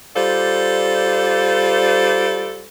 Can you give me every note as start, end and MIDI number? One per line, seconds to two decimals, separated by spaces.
0.15 2.67 55
0.15 2.67 65
0.15 2.67 69
0.15 2.67 72
0.15 2.67 74